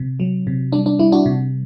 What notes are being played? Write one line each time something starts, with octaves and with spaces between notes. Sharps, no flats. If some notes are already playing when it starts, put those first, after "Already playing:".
Already playing: C3
F#3
C3
G3 D4
D4
G3 E4
D4 F#4
C3